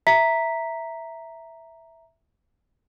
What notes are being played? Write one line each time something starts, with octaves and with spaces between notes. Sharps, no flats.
E5 A#5 B6